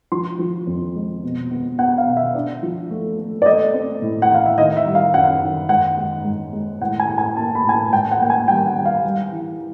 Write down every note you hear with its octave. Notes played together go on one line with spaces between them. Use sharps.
F3 C6
F3
F2
G#3
B2
B3
B3 F#5
F5
B2
E5
D4
F3
A3
A3
D5
A3 D#5
C4
A2
F#5
E3
F5
E5
D#3 D#5
E5
G3
F5
F#2 F#5
D#3
G#2 F#5
G#3
G#2
G#3
A2 F#5
G#5
A2
G#5
A#3 A5
B5
A2 G#5
A5
G#2 G5
F#5
A#3 G5
G#5
G3 G5
F#5
G3
F5
G3
E3